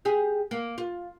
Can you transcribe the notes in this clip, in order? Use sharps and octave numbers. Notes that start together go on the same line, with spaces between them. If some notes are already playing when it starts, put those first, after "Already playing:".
G4 G#4
A#3
F4